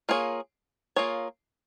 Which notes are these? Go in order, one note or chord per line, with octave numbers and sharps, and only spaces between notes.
A#3 F4 G#4 C#5
A#3 F4 G#4 C#5